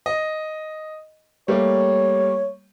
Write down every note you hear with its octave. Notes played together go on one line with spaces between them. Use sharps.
D#5
G3 A3 A#3 C#5